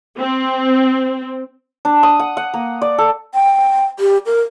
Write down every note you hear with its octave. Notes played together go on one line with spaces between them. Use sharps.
C4
D4
D#6
F#5
F#5
A#3
D5
A4
G5
G4
A#4